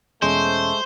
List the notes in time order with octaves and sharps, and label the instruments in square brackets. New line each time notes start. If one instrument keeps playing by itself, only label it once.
[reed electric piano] E2 B2 C#4 [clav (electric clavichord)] G#3 [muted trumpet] A3 [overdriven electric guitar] C5